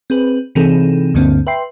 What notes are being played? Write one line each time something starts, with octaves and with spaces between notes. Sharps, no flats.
C4 G#4 B4
C3 E3 C4 D#4 G#4 A4
D2 G2 D3 A#3 C4
B4 E5 G5 C6 C7